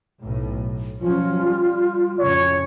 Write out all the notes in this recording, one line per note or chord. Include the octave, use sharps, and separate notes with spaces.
B1 A2
F3 F#3 C#4 F4
G3
F2 A2 C#3 C#5